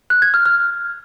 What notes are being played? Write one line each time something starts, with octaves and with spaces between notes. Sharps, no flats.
F#6
G#6
F6
F6